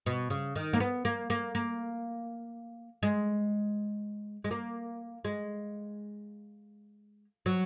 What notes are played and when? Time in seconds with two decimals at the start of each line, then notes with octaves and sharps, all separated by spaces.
0.06 B2
0.30 C#3
0.56 D#3
0.73 A#3
0.80 B3
1.05 A#3
1.30 A#3
1.55 A#3
3.03 G#3
4.44 G#3
4.51 A#3
5.25 G#3
7.46 F#3